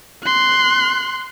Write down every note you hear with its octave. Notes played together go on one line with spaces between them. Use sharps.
C6 F#6